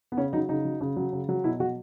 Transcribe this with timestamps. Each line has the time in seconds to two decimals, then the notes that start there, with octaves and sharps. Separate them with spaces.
0.12 B3
0.17 C#3 C#4
0.33 F#3 D#4
0.49 C#3 D#4
0.65 F#3
0.81 C#3
0.96 F#3
1.13 C#3
1.29 F#3
1.44 B2 E4
1.60 F#3 F#4